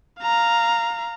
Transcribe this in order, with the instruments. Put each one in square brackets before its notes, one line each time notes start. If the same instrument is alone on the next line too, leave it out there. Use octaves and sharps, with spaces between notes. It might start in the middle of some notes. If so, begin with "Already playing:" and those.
[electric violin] F5 A#5